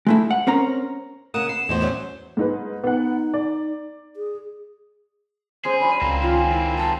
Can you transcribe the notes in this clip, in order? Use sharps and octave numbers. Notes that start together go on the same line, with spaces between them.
G#3 A3 E4
F#5
C4 C#4 A#4 A#5
C#3 A#3 F#5 D#6 E7
B3 C7
E2 A2 G#3 F#4 C5
D2 F#3 C#4
G#2 D#4 B4
B3 D#4 F#5
D5
G#4
G#3 C#4 G#4 C5 C6
F#3 D4 B5
C#2 A#3 C4
D#3 F3 C#4 F4
E4 A#4
F#3 A5 B5